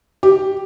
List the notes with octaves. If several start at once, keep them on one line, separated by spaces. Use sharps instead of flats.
G4